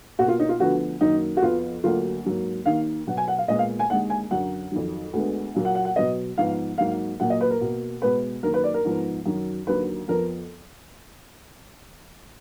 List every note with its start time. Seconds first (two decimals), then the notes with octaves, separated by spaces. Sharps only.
0.19 B2 A#3 F#4
0.28 F4
0.39 D#4
0.49 F4
0.60 D2 D3 F3 B3 F#4
1.01 F#2 D#3 A#3 D#4
1.37 F#4
1.42 F2 F3 B3 F4
1.84 D2 D3 F#3 A#3 F4
2.24 G#2 F#3 A#3
2.65 D#2 D#3 A#3 F5
3.07 B2 F#3 B3 F#5
3.17 G#5
3.28 F#5
3.38 F5
3.48 A#2 G#3 B3 D#5
3.59 F5
3.79 G#5
3.90 D#2 D3 G#3 F#5
4.10 G#5
4.31 F#2 D3 F#3 F#5
4.72 F2 D#3 F#3
5.13 D2 D3 G#3 B3
5.54 A#2 F#3 A#3
5.65 F#5
5.75 F#5
5.85 F#5
5.96 B2 F#3 B3 D#5
6.38 G#2 F3 B3 F5
6.78 G#2 F#3 A#3 F5
7.20 A#2 F#3 A#3 F#5
7.30 D#5
7.41 B4
7.50 A#4
7.61 B2 A#3
8.02 B2 G#3 B3 B4
8.43 F#2 D#3 A#3 A#4
8.54 B4
8.64 D5
8.74 A#4
8.84 G#2 F3 B3
9.26 F#2 D#3 F#3
9.67 D#2 D3 F#3 A#3 B4
10.08 F2 F3 B3 A#4